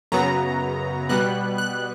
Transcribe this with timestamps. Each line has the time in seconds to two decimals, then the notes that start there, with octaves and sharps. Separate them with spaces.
0.12 F#2 C#3 F#3 B3 A#5
1.09 B2 G3 B3 F#6
1.58 F#6